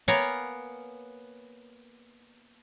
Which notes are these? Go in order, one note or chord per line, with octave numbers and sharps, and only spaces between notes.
A#3 B3 A#4 C#5 F5 G#5